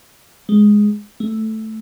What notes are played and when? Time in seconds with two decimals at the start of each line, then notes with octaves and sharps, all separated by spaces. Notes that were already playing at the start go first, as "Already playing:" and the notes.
0.49 G#3
1.20 A3